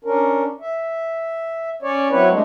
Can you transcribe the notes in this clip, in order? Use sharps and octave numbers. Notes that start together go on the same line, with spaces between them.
C#4 D4 A#4
E5
C#4 C#5 D5
F#3 C4 E4 B4 C#5
G#3 A3 D4